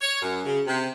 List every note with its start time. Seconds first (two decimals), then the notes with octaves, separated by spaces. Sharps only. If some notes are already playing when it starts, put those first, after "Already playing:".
0.01 C#5
0.22 F#2
0.46 C#3
0.66 C3